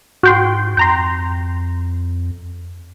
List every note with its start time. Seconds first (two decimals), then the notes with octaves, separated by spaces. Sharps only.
0.23 G#2 F#4 G5 C6
0.77 F2 G5 A#5 C6